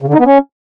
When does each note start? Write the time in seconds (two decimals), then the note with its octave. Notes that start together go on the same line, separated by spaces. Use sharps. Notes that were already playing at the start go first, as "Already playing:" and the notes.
0.02 C#3
0.08 D3
0.14 D#4
0.20 B3
0.26 C#4